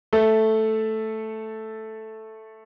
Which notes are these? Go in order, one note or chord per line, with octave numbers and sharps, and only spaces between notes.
A3 A4